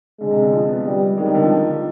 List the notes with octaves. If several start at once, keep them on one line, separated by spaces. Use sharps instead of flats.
D3 G#3
C3
D3
F3
B3
G3
D#3 G#3
G3
D3
F3